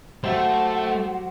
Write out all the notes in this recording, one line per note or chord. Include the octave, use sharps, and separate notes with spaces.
F#3 A3 G4 A4 C5 F#5